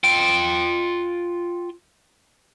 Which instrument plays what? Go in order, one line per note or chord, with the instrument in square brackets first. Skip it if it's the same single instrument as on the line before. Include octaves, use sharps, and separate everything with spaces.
[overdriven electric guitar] F4 G5